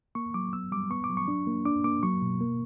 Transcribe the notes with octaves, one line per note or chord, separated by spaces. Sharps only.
A#3 C#6
F#3 D6
B3 E6
G3 D6
B3 C#6
D6
F#3
C#6
D4
A#3
D4 D6
A#3 D6
F#3 C#6
B2
A#3